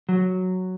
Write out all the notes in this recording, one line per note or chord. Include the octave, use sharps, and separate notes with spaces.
F#3